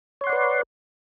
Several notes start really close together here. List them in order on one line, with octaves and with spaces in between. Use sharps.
C#5 C6 F#5 D5 B4